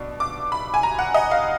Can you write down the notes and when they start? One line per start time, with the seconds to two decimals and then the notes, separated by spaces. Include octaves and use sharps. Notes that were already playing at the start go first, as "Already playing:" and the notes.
Already playing: B2 D4
0.20 D6
0.52 B5
0.74 G#5
0.83 A#5
0.99 F#5
1.14 D#5
1.31 F5